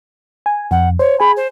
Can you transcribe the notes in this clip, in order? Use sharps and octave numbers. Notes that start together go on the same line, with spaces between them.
G#5
F2 F#5
C5 C#5
G#4 G#5 B5
C5